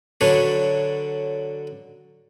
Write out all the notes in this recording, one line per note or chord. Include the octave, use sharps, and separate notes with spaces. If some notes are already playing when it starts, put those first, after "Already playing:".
D3 F#3 D4 B4 C#5